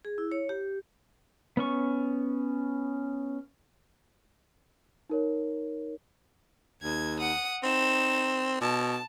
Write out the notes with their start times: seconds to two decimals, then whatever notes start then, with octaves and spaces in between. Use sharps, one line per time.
0.05 G#4
0.18 E4
0.32 C#5
0.49 G4
1.57 B3 C#4 C#6
5.10 D#4 A#4 C#5
6.82 D#2 G#6
7.20 F#5 D#6
7.63 C4 D#4 E7
8.61 B2 A5